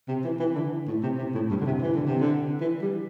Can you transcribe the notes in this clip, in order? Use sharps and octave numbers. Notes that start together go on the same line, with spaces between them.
C3
E3
E3
D3
A2
C3
C3
A2
G2
D3
C3
E3
D3
C3
D3
E3
G3